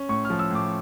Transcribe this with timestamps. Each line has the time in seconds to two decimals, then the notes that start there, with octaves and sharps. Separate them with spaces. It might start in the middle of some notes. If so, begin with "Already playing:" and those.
Already playing: C#4
0.09 A2 C#6
0.25 F6
0.30 F3
0.39 E6
0.51 A2 D6